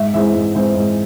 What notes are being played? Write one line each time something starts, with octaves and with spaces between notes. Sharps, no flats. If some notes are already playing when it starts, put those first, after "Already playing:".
Already playing: G#2 E5
E3 G#3 C4 E4 E5
G#2
E3 G#3 C4 E4
G#2